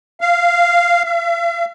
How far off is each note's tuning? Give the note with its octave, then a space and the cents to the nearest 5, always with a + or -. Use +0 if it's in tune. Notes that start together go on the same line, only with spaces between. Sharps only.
F5 -10
F5 -45